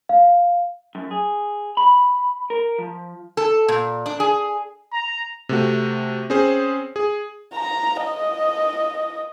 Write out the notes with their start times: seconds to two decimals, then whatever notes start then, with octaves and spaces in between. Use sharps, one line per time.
0.09 F5
0.95 F#2
1.11 G#4
1.77 B5
2.50 A#4
2.78 F3
3.37 A4
3.68 A#2
4.06 D4
4.20 G#4
4.93 A#5
5.49 C3 A3 F#4
6.30 C4 C#4 G#4 C5
6.96 G#4
7.54 A#5
8.02 D#5